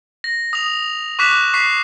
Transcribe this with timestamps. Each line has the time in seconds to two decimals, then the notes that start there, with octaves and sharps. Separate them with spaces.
0.24 A#6
0.53 D#6 F7
1.19 C#6 D6 F#6 B6 E7
1.54 C#6 B6 C7